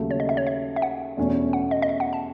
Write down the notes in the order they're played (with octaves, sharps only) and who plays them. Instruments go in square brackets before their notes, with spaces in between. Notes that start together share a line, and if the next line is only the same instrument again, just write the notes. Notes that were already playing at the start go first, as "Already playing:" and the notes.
Already playing: [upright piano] D#2 C#3 F#3 A3
[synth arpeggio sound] C#5
D#5
E5
C#5
E5
E5
F#5
[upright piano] E2 B2 A3 C#4
[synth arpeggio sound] F#5
D#5
D#5
E5
F#5
A5